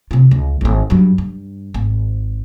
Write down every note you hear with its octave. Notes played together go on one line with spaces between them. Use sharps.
C3 F4
C#2
G#1 C4
G2 F#3
G2
G#1